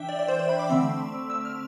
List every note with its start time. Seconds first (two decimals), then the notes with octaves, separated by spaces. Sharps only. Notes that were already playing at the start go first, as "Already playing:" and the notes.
Already playing: E3 D4 E5 G5
0.09 D5
0.19 D5
0.28 C5
0.39 C5
0.49 B5
0.59 D6
0.70 D3 A3 C4 E6
1.30 E6
1.45 F6